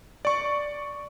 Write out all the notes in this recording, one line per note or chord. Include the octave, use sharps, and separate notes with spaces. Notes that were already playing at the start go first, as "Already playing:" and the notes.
D5 C#6